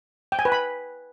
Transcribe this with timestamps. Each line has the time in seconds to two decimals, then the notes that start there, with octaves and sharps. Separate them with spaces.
0.32 G5
0.39 G#5
0.45 B4
0.52 B5